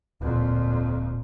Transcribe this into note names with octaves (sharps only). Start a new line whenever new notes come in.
D1 F2 A#2